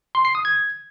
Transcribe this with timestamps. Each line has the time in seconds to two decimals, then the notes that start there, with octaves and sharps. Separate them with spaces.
0.15 C6
0.25 C7
0.35 D#6
0.45 G#6